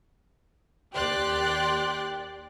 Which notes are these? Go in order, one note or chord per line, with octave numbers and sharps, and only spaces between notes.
D#2 G4 D5 G5 C6 F#6